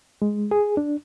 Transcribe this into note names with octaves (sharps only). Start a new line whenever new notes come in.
G#3
G#4
D4